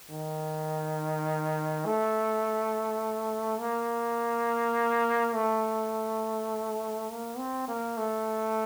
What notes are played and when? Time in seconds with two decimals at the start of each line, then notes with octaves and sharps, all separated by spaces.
0.10 D#3
1.86 A3
3.60 A#3
5.34 A3
7.10 A#3
7.38 C4
7.68 A#3
7.97 A3